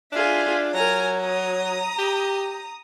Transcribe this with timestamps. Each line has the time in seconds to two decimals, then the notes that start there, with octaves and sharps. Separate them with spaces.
0.12 D4 F4 G#4 E5
0.74 F#3 A#4 G#5 A#5
1.20 A#5 D#6
1.99 G4